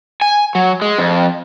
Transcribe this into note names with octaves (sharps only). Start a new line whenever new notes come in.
G#5
F#3
G#3
F2